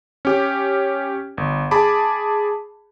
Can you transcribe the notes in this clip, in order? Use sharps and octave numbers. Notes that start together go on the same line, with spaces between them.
C#4 G4
G1
G#4 A5 B5 D6